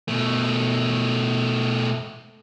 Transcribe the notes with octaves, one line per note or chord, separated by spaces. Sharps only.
B2 A3